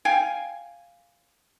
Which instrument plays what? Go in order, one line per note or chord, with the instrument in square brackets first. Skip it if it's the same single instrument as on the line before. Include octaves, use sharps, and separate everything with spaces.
[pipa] F5 G5 G#5